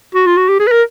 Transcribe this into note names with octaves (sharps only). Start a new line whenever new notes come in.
F#4
F4
F#4
G4
G#4
B4
A#4